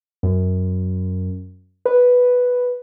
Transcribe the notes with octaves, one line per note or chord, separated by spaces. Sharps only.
F#2
B4